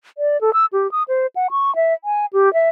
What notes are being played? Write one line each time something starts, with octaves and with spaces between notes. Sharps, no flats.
D5
A4
E6
G4
D#6
C5
F#5
C#6
E5
G#5
G4
E5